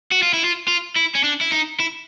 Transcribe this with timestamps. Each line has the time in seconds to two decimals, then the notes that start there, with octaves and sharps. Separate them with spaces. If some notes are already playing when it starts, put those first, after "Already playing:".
0.11 F#4
0.22 F4
0.33 E4
0.44 F4
0.68 F4
0.96 E4
1.15 C#4
1.24 D4
1.41 E4
1.52 D#4
1.80 E4